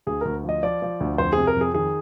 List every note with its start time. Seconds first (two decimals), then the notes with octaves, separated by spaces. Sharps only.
0.07 D2 G#4
0.21 D2 A#4
0.44 F3 D#5
0.63 F3 D5
0.82 F3
1.00 D2
1.18 F2 C5
1.33 C3 G#4
1.47 A#4
1.56 F2 G#4
1.74 D#3 G#4